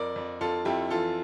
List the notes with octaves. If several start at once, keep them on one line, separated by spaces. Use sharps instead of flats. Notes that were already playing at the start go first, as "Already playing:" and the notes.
Already playing: F2 A#4 D5
F2
F2 F4 A4
F2 E4 G4
E3 F4 A4